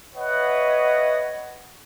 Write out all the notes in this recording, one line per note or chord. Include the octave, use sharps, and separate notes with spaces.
B4 C#5 D#5 E5 F#5